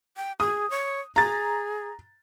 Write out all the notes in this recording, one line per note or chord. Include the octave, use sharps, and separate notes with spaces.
G5
G#4 D#6
C#5
G#4 A#5 A6